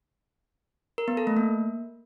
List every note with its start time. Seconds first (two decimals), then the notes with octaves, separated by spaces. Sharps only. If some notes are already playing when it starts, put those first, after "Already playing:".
0.98 A#4
1.08 B3
1.17 A4
1.27 A3
1.37 A#3